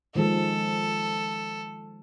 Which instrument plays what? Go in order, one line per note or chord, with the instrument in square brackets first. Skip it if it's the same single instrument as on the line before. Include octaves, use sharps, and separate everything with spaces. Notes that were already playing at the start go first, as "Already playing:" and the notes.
[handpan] D#3 F3 G#3 [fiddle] A4